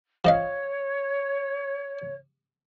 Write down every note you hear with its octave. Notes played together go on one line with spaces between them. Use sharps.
F3 C#5 D#5 F5